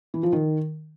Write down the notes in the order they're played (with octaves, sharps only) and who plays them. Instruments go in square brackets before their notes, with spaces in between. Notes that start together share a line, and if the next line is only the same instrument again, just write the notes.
[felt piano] E3
F3
D#3